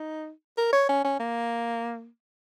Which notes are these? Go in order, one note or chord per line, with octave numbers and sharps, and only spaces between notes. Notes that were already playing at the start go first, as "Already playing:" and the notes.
Already playing: D#4
A#4
C#5
C#4
C#4
A#3